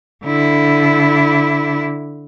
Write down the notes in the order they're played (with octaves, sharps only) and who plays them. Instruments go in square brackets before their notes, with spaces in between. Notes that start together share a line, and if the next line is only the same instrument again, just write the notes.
[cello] D3 E4